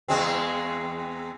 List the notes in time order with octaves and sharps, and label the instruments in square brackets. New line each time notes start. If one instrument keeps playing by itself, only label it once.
[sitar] E2 G#3 C4